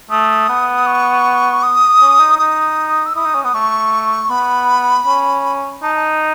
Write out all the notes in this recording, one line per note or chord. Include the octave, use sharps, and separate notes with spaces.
A3 D#6
B3
C#6
D#6
C#4
D#4
D#4 D#6
E6
E4 D#6
D#4
C#4
B3 D#6
A3 C#6
B3 B5
C#4
D#4 A5
A5